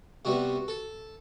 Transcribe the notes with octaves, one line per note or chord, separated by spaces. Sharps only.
C3 G3 B3 F#4
A4